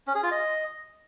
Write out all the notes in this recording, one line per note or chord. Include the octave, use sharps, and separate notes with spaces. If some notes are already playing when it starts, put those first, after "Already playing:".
C#4
G#4
F4
D#5